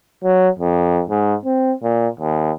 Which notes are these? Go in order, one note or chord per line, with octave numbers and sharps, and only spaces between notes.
F#3
F2
G#2
C4
A#2
D#2